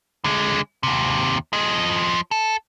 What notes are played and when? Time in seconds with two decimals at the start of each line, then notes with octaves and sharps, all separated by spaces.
0.24 D3 G#3
0.83 D#2 C3
1.53 F3 D#5
2.31 A4